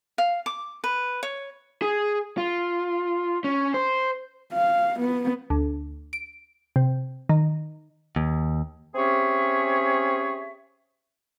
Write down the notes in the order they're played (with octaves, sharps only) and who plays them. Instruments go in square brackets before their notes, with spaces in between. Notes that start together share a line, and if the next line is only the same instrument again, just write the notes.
[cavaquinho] F5
D6
B4
C#5
[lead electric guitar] G#4
F4
C#4
C5
[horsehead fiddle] F5
B3
[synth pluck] D2
D7
C3
D#3
[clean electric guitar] D#2
[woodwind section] C4 C#4 G4 G#4 C#5 E5